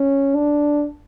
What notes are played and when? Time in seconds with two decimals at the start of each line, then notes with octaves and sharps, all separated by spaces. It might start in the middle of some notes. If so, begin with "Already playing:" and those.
Already playing: C#4
0.36 D4